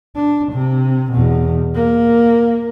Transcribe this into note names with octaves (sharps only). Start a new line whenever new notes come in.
D4
C3
E2 B2
A#3